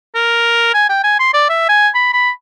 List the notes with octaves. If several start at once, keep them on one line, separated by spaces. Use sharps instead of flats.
A#4
G#5
G5
G#5
C6
D5
E5
G#5
B5
B5